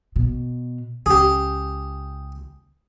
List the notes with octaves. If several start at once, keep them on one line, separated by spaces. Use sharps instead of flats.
B2
C#2 G4 G#4